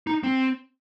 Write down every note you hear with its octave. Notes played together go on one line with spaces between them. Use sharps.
D#4
C4